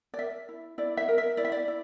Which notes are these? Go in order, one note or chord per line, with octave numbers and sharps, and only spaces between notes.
D5
A#4 E5
E4
E4 D5
E5
A#4
E5
E4 D5
E5
D5
E4